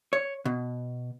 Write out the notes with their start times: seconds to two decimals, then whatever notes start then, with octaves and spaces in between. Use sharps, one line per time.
0.13 C#5
0.45 B2